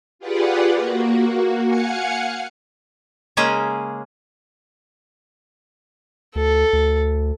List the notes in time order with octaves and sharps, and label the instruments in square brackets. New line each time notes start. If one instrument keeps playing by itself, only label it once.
[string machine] F4 G4 G#4 B4 D5 F#5
A#3 F#4
F5 F#5 G#5 C#7
[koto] C#3 G#3 A#3 C#4 G#4
[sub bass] D2 [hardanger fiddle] A4
[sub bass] D2